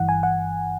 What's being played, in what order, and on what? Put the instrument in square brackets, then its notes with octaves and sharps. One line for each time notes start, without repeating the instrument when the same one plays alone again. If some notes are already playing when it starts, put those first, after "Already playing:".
Already playing: [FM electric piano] G1 G2 E3 F#5
G#5
F#5